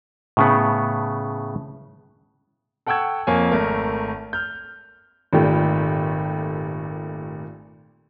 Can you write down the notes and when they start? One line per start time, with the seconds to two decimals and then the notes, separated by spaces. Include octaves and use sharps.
0.37 A2 C#3 B3
2.86 A4 F#5 G5 C#6 E6 G#6
3.27 F2 A#3 C#5 G#5
3.51 G#1 A3 A#4
4.33 F6 G6
5.33 G#1 A#2 A3 G4